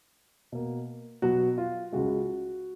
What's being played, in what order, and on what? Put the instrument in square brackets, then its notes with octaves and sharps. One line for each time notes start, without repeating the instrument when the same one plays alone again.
[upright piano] B2 A#3
B2 F#3 B3 F#4
F4
C#2 C#3 G#3 F#4